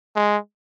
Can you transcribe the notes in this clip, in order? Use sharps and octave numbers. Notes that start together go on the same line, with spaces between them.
G#3